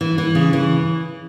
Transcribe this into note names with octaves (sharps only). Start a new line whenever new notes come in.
E3
E3
C#3
E3